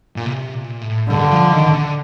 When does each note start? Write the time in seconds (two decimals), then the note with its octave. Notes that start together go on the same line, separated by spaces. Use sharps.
0.16 A#2
0.26 C3
0.54 A#2
0.81 A2
1.10 G2 D3
1.31 F3
1.52 D#3
1.72 D3